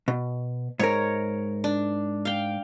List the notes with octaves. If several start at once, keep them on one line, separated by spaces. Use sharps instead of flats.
B2
G#2 A#4 C#5
D4
F5 G5